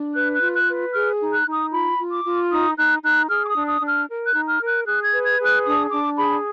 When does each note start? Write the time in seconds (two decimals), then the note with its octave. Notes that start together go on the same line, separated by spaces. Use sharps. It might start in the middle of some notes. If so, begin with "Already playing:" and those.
Already playing: D4
0.14 B4 F#6
0.34 F#6
0.42 F4
0.54 F#6
0.67 B4
0.94 G#4 F6
1.20 D#4
1.33 F#6
1.46 D#4
1.52 D#6
1.71 F4 B5
1.98 F4
2.11 D6
2.24 F4
2.51 D#4 D#6
2.77 D#4 F#6
3.02 D#4 F#6
3.29 G#4 F6
3.45 D6
3.49 D#6
3.55 D4
3.68 D#6
3.81 D4
3.87 F6
4.08 A#4
4.27 F#6
4.33 D#4
4.47 F6
4.61 A#4
4.66 F#6
4.86 G#4 F#6
5.05 G#6
5.12 B4
5.25 G#6
5.39 G#4
5.45 F#6
5.65 D4 D#6
5.91 D4 D6
6.17 G#4 B5